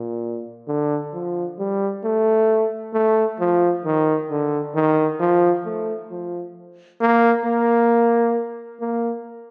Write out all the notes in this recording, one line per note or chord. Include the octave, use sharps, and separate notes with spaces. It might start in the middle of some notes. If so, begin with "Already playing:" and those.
Already playing: A#2
D3
F3
G3
A3
A3
F3
D#3
D3
D#3
F3
A3
F3
A#3
A#3
A#3